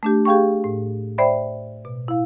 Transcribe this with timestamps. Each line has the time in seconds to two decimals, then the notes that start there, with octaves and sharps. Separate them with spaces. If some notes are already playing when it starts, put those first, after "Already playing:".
0.03 A3 D4 G4
0.25 G4 G#4 F5 G5 C#6
0.64 A2
1.18 C5 D5 E5 G5 B5
1.85 B2
2.08 E4 F5